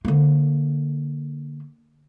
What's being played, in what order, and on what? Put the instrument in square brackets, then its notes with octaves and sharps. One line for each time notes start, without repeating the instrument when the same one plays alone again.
[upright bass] D3 A#3